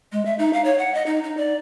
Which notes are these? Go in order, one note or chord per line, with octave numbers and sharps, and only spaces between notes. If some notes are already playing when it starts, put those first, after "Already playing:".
G#3
E5
D#4
F5
C#5
F#5
D#5
D#4
D#4
D5